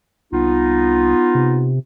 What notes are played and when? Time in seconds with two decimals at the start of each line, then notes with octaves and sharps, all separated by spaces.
0.32 C2 B3 D#4 F4
1.35 C3